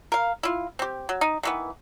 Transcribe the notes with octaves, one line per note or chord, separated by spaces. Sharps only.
A#4 F5
E4 F4
C4 G4
F#3
D#4
D#3 E3 B3